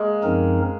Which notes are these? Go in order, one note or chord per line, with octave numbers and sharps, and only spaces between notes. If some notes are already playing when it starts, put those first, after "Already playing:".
Already playing: G#3 A#3
F#2 F3 C4 D#4 A#4